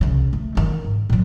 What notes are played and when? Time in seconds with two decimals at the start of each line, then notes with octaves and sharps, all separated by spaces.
0.01 C2 C#3
0.33 A3
0.55 D#3 D#4
0.85 G#2
1.10 A#2 F#3